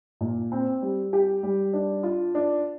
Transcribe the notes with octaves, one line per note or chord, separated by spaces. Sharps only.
A#2
C4
G3
G4
G3
D4
F4
D4